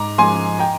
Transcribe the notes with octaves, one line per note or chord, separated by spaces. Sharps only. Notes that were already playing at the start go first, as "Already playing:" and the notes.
Already playing: G#2 A#5 D6
F3 G#3 G#5 C6
G5 A#5